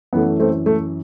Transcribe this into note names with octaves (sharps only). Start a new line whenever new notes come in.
F#2 E3 A3 B3
A3 C4
A3